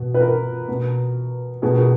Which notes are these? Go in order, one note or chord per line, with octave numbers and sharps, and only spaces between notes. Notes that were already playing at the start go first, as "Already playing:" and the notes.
Already playing: B2
B4
A#4
B2
B2 G#4
A#4
G#4